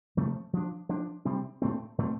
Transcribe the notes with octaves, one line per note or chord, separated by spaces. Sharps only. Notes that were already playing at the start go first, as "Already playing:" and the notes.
C3 F3 A3
F3 D4
F3 D4
C3 G3 C4
A2 A3 C4
A2 A3 C4